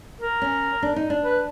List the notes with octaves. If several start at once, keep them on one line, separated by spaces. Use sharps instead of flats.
A#4
C#4
D4
D#4
D4
B4